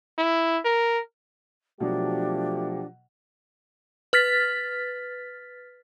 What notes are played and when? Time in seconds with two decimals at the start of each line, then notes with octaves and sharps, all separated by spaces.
0.18 E4
0.65 A#4
1.80 B2 F3 F#3 A3 D4 G4
4.13 B4 F6 A6 B6